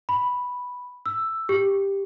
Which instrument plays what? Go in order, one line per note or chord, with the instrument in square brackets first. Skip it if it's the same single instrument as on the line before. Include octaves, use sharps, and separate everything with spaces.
[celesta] B5
E6
G4